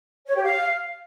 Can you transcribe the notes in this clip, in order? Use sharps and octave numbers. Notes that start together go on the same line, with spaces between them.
C#5
G4
F5